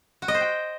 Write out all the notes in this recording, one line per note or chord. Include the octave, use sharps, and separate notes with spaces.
F#4
D#5
C5
G5